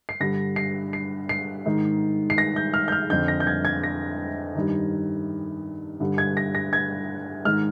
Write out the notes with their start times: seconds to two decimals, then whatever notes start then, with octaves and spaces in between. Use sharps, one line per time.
0.09 C7
0.20 G2 D3 A#6
0.56 C7
0.93 C7
1.29 C7
1.66 G#2 D#3
2.30 C7
2.38 A#6
2.56 G6
2.74 F6
2.88 G6
2.92 F6
3.10 F2 D3 G6
3.28 A#6
3.40 G6
3.47 G#6
3.65 G#6
3.83 A#6
4.55 G2 D#3
6.00 G2 D3
6.18 G#6
6.37 A#6
6.55 A#6
6.73 G#6
7.45 G#2 D#3 F6